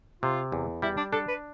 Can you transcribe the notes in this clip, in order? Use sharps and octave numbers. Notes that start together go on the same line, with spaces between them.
C3 F4
E2
G3 E4
D4
D4 A4
B4